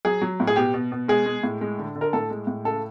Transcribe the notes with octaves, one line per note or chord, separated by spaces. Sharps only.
F#3 G#4
F#3
A2
G#4
B2 G4
B2
B2
G#3 G#4
G#3
A2
G#3
D3
D3
A#4
A2 A4
G#3
A2
C#3 A4